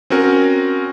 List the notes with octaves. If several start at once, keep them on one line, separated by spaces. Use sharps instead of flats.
C4 C#4 F#4 A#4